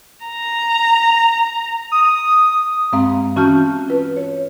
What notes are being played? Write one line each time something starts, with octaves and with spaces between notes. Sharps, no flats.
A#5
D#6
G2 G#3 C4 F5 A#5
E3 C#4 F#4 A5 F6 G6
F4 B4
C#5